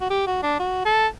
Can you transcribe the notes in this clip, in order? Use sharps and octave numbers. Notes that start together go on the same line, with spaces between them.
F#4
G4
F#4
D4
F#4
A4